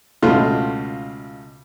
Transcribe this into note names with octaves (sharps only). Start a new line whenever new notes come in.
C#2 B2 A3 F4 C6